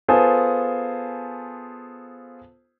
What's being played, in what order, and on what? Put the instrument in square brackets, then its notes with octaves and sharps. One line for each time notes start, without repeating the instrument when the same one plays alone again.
[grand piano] B3 F4 G#4 A4 C5 G#5